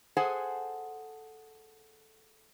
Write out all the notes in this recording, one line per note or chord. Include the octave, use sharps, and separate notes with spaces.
G#4 A4 C5 F#5 G#5